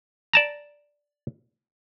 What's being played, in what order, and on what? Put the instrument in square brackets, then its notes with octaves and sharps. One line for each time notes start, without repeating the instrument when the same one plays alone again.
[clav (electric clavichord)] D5 A5 A#5